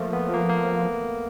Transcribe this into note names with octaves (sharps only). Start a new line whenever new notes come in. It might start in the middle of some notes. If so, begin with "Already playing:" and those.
Already playing: F3 A3 A#3
B3
A#3
A#3